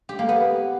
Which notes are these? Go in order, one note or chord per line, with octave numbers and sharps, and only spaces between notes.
G4
A#3
B3